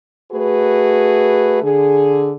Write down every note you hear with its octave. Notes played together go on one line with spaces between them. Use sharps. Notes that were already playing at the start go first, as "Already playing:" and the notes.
A3 F#4 G#4 B4
D3 G#4